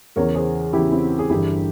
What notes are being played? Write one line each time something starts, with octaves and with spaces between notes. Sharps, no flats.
E2 C#3 E3 A#4 C#5
G#4 C5
E2 C#3 E3 E4 G4
C4 E4
G#4
G1 G2 E3 E4 G4